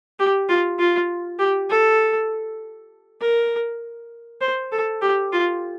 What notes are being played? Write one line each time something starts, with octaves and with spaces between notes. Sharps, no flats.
G4
F4
F4
G4
A4
A#4
C5
A4
G4
F4